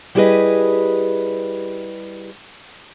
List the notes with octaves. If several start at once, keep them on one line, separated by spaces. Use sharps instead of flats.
G3 E4 G4 G#4 B4 D#5